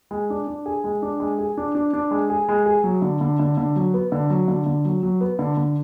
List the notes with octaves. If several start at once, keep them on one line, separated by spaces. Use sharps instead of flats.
G#3
D4
D4
G#4
G#3
D4
G#3
G#4
D4
D4
D4
G#3
G#4
G#3
G#4
F#3
D3
D3
D3
D3
F#3
B3
D3
F#3
D3
D3
F#3
F#3
B3
D3
D3